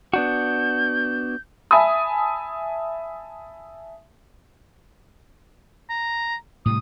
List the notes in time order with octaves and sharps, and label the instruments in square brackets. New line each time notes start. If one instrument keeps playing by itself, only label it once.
[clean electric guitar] B3 D4 F#4 [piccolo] G6
[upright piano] E5 G#5 A5 B5 D#6
[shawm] A#5
[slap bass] A2 C3 G3 [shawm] D#6